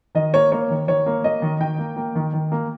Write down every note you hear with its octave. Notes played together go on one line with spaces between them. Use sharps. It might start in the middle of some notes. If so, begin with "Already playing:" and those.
D#3 D#5
A#3 C#5
A#3 C#5
D#3
D#3 C#5
A#3
A#3 D#5
D#3
D#3 G5
A#3
A#3
D#3
D#3
A#3